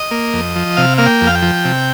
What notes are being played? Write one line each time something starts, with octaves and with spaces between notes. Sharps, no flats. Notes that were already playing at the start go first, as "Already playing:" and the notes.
Already playing: D#5
A#3
F2
F3
C3 F5
A#3 F5
G5
F2
F5
G5
F3
C3